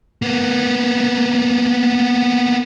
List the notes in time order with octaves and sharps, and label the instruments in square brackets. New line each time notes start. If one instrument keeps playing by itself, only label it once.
[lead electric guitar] A#3 B3